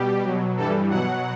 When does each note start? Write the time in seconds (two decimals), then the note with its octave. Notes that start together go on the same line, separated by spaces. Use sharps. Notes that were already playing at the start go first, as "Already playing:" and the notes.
Already playing: B2 G3 G4
0.24 B2 F#3
0.57 G2 E3 G3 A4
0.90 B2 F#3 F#5